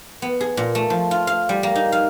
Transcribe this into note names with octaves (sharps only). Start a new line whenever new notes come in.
B3
G#4
A#2
A3
F3
F4
F5
G3
A#3
D#4
F5